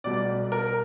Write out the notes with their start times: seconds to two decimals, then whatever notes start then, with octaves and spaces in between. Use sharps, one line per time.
0.04 B1 B2 G3 D5
0.52 A#4